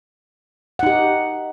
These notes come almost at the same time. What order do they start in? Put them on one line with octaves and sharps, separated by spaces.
F#5 D#4 G4